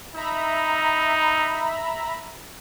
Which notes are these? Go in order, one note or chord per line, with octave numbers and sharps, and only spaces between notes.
D#4 E5 A#5 B5